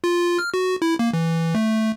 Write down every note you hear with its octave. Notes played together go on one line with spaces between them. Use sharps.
F4
F6
F#4
E4
A#3
E3
A3